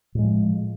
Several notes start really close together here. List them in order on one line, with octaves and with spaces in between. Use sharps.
A2 G#3 F3